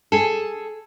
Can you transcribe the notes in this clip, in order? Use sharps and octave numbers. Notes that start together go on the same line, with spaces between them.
G#4 A4